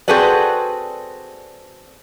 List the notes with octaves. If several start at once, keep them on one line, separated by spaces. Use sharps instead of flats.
C4 F#4 G#4 A4 B4 D5